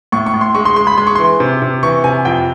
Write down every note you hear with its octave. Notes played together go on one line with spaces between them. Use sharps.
A2 C#6
C#6
A2
C6
G#3 C#6
C6
G#3 C6
B5
G#3 C6
C#6
E3 C6
C3
C3
E3 C#6
C3 G#5
F2 G5